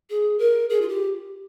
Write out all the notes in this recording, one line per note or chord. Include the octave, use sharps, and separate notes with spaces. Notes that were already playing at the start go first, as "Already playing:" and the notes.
G#4
A#4
G#4
F4
G4